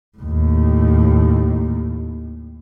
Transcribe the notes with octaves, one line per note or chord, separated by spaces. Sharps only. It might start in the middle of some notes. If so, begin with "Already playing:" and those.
D#2 A2